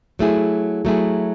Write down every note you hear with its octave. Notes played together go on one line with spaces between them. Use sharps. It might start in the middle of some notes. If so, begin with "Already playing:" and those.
F#3 A3 E4 G#4
F#3 A3 E4 G#4